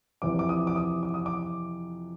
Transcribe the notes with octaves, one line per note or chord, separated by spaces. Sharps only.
F2 C3 E3 D6
D6
D#6
D6
D#6
D6
D#6
D6